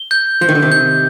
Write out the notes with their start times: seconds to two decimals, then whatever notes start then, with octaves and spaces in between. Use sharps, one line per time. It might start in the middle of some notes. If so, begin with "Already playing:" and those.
Already playing: G7
0.11 G6
0.41 F3 G6
0.49 D#3
0.55 D3
0.62 C3 D#3
0.72 G6